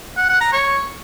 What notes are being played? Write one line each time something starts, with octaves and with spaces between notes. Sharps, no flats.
F#5
F#5
A#5
C#5